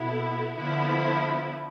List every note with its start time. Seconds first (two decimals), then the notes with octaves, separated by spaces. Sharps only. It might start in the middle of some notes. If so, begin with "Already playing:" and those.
Already playing: B2 B3 E4 A4
0.57 D3 F3 B3 E4